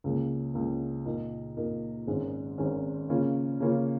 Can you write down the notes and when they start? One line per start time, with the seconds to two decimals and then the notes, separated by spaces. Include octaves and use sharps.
0.04 C#2 C#3 A#3
0.54 C#2 C#3 A#3
1.05 A#2 A#3 D#4 A#4
1.57 A#2 A#3 D#4 A#4
2.07 G#1 G#2 D#3 G#3 C#4
2.58 G#1 G#2 D#3 G#3 C#4
3.09 C#3 A#3 C#4 F4
3.60 C#3 A#3 C#4 F4